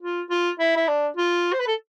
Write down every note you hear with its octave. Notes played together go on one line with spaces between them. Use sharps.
F4
F4
E4
E4
D4
F4
C5
B4
A4